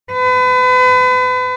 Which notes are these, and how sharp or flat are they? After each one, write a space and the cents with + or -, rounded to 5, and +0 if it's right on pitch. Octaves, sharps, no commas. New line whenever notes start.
B4 +35